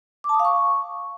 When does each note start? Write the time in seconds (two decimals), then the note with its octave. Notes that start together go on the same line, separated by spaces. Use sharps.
0.24 D6
0.29 A5
0.34 D#6
0.40 F5
0.45 C#6